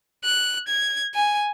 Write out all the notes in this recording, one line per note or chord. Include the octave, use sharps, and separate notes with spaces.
F#6
G#6
G#5